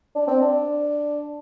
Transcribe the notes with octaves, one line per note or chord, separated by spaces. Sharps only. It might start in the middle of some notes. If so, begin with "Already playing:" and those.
D4
C4
D4